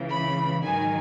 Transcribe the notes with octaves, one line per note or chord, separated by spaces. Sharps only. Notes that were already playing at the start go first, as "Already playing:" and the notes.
Already playing: C#2 C#3 E3
B5
G#2 D#3 F#3 G#5